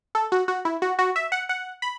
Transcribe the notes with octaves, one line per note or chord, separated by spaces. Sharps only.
A4
F#4
F#4
E4
F#4
F#4
E5
F#5
F#5
B5